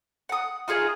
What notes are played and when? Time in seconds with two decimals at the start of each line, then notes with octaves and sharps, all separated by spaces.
0.29 F#5 D#6
0.68 D#4 F4 G#4 D#5